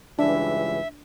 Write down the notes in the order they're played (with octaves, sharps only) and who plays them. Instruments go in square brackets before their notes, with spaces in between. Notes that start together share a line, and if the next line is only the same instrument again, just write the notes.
[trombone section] C#2 G2 E3 [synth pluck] D4 [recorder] E5